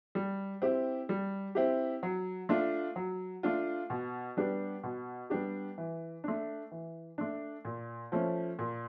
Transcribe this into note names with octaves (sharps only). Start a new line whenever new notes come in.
G3
C4 E4 G4
G3
C4 E4 G4
F#3
A3 D4 F4
F#3
A3 D4 F4
B2
G3 B3 D4 G4
B2
G3 B3 D4 G4
E3
A3 D4
E3
A3 D4
A#2
F3 A3 C#4
A#2